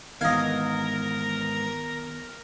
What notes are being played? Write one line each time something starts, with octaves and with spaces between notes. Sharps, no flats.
G#2 D#3 E3 B3 A#4 D#5 F5 G#6